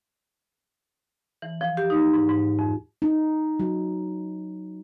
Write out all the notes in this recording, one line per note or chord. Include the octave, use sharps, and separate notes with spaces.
E3
F3
G4
D#4
G#2
G#2
F2
D#4
F#3